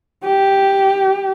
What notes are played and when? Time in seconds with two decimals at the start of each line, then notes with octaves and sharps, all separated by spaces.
0.24 G4